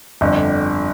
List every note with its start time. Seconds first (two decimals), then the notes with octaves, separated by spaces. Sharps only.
0.21 G1 F2 D3